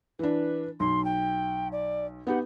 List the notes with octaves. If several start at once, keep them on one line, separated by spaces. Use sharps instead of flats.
E3 D4 B4
B1 C6
G5
D5
B3 D#4 G4 F#5